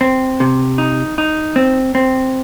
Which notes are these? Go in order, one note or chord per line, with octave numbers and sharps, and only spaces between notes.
C4
C3
D#4
D#4
C4
C4